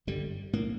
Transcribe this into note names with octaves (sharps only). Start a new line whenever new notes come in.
G2 D3 G3
A2 A#3